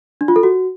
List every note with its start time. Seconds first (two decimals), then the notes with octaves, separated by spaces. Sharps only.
0.21 D4
0.28 F4
0.36 A4
0.43 F#4